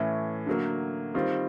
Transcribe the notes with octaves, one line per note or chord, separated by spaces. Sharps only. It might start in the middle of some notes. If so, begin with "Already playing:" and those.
Already playing: A2 E3 A3 C#4 E4
D3 F#3 A#3
D#3 G3 C4 F4